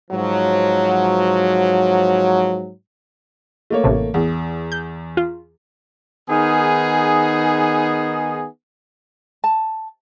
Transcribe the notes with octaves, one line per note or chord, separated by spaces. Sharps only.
G#2 F3 F#3
A3 A#3 C#5
A1 A2 C3
E2
G6
F4
D#3 B3 D#4 G#4
A5